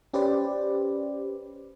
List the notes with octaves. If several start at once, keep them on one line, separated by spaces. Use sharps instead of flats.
C#4 G4 B4 C5 D5